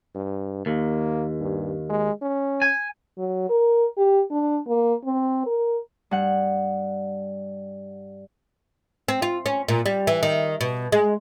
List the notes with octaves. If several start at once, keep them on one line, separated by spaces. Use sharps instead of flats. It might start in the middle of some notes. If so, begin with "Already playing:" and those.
G2
D#2 A#3
G2
G#3
C#4
G#5
F#3
A#4
G4
D4
A#3
C4
A#4
G2 F#5
C4
F4
C#4
A#2
G3
E3
D#3
B2
G#3